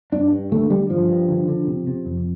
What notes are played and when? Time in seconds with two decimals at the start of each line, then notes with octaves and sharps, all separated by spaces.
0.12 G2 D4
0.32 G2
0.52 D3 A3
0.70 D3 G3
0.89 G2 F3
1.09 G2
1.29 D3
1.48 D3
1.68 C3
1.87 C3
2.06 F2